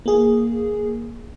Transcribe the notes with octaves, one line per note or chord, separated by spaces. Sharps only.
A#3 G#4